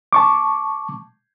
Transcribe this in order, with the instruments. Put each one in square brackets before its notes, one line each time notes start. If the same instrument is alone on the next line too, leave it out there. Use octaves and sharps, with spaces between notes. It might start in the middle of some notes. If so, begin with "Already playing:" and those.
[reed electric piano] A5 C#6 D6